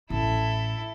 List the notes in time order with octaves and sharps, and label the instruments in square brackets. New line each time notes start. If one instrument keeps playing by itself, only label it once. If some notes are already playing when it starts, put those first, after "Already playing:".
[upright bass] A1 [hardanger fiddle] E4 A4